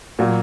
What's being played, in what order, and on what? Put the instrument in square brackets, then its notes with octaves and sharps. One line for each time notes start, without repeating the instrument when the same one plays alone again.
[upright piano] A#2 F#3 A#3